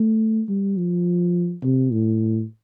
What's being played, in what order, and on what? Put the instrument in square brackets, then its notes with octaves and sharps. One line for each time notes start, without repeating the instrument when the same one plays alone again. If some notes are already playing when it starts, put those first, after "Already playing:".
Already playing: [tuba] A3
G3
F3
C3
A2